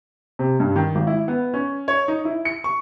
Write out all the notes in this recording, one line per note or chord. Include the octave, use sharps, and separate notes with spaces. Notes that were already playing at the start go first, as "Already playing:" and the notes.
C3
G2
D#3
G#1
E4
B3
C#4
C#5
D#4
E4
C#7
C#6